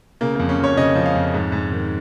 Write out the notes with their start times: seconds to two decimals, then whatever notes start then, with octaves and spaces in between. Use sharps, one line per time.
0.21 C#3 A#3
0.35 F2 A#3
0.49 C#4
0.59 F2 C#5
0.77 C#3 D#5
0.96 F3
1.06 F5
1.15 F2
1.34 G#2
1.52 G#2
1.72 D#3